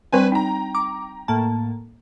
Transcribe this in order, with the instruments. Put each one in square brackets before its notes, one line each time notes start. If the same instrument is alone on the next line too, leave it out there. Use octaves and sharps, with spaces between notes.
[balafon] G3 C4 D4 [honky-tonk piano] B4 C5 G#5
[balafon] D#4 [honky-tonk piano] G5 A#5
[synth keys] D6
A2 A#3 A5